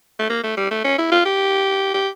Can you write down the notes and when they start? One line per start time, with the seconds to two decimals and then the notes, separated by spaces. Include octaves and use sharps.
0.19 A3
0.30 A#3
0.44 A3
0.57 G3
0.71 A3
0.84 C#4
0.98 E4
1.12 F4
1.25 G4
1.94 G4